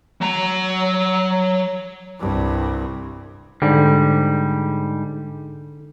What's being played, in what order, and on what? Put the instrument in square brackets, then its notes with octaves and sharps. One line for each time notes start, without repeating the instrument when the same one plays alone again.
[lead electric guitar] F#3 A#5
[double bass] C2 G2
[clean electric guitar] G#2 G3 [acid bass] D3